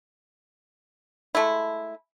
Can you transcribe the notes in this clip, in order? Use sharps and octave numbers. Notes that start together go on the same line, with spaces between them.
G#3 A3 E4